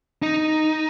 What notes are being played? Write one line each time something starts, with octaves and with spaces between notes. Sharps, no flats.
D#4